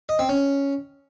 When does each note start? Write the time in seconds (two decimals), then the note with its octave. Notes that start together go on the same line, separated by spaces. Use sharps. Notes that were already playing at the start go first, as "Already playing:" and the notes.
0.09 D#5
0.19 C4
0.29 C#4